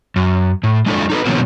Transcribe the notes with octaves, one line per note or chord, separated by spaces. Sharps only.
F#2
A2
G#3 D4 E4 A4 D5
D#4 A4 B4
B2 D3 E3 F#3 A#3 C4